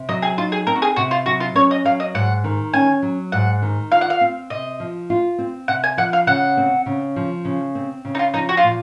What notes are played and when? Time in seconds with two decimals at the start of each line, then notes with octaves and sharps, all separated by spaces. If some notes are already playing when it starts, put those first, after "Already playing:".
Already playing: C3
0.09 F#3 D#5
0.22 G#4
0.38 D#4 F4
0.52 G#4
0.67 C4 A#4
0.75 F#4
0.82 G#4
0.96 C3 F#4
1.11 F4
1.26 F#3 F#4
1.40 F4
1.55 C#4 C#5
1.71 D#5
1.85 F#3 F5
2.00 D#5
2.14 G#2 F#5
2.44 D#3
2.73 C#4 G#5
3.02 F#3
3.32 G#2 F#5
3.62 D#3
3.91 F4 F5
4.01 F#5
4.10 F5
4.21 C4
4.50 C3 D#5
4.80 F3
5.10 F4
5.38 C4
5.68 C3 F#5
5.84 G#5
5.97 F3 F#5
6.13 F5
6.27 C#3 F#5
6.57 C4
6.86 C#3
7.16 F3
7.45 C#3
7.75 C4
8.05 C#3
8.15 D#4
8.19 F4
8.34 F3 D#4
8.49 F#4
8.57 F4
8.63 A#2